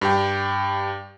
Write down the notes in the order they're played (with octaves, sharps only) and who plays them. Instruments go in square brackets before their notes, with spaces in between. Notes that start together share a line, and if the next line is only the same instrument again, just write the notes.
[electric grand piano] G2 G4 G5